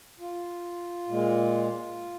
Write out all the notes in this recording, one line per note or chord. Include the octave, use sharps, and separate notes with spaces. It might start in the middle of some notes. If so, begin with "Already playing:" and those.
F4
A#2 G#3